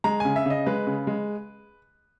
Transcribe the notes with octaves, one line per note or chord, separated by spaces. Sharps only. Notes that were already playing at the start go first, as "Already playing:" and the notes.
G#3 A#5
C#3 G#5
E5
C#3 D#5
G#3 B4
C#3
G#3